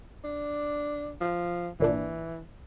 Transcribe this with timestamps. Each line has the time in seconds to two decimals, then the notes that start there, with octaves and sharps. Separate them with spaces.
0.24 D4
1.20 F3
1.80 G#1 A#2 E3 D4